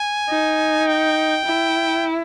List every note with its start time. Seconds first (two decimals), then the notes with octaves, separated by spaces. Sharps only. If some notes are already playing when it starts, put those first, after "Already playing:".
Already playing: G#5
0.29 D#4
0.87 G5
1.46 E4